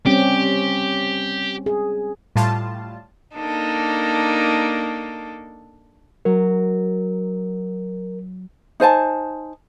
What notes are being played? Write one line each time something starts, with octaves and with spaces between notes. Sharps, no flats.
G3 C4 C#4 G4
G#4
A2 G3 F4 A5
A#3 D4 D#4 A4
F#3 A#4
D#4 C5 G#5 A5